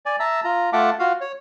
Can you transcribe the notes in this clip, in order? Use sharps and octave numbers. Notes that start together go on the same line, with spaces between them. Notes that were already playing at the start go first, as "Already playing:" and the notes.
D5 G#5
E5 A5 A#5 E6
F4 A#5
A3 F4 E5 F#5 A5 D6
F4 F#4 F5
C#5